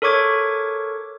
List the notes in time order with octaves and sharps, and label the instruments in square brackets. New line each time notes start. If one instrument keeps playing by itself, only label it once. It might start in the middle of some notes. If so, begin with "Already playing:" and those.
[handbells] A4 A#4 C#5 C#6 D6 G#6